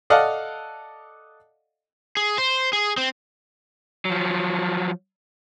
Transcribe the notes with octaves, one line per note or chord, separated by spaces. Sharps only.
A4 D5 D#5 F5 F#5
G#4
C5
G#4
C4
F3 F#3